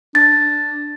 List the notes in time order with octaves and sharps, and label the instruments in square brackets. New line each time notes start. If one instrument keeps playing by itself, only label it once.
[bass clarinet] D4 [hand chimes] A6